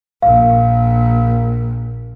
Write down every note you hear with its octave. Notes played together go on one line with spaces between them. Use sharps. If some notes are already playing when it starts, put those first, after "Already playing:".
A#1 A#2 F5